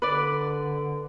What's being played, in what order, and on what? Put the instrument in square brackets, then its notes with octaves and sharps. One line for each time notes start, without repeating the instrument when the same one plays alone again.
[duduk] D3 [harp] B4 D5